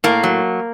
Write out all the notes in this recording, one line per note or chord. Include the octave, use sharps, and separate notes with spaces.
A2 A#3
F#3